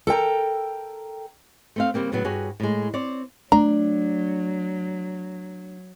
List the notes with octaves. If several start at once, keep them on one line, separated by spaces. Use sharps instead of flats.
A4 A#4 G5 A#5
A3 C4 F5
C#3 G3 A#3 C4
A2 C#3 F#3 B3
G2 F#4 G#4 C#5
A2 G#3
C4 C#5 D5
F#3 A3 D4 A#5